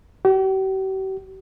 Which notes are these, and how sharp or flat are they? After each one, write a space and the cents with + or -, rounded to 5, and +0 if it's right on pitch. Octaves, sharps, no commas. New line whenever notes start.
G4 -45